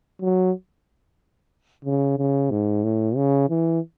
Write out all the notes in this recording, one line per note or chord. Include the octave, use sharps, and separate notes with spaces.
F#3
C#3
C#3
G#2
A2
C#3
E3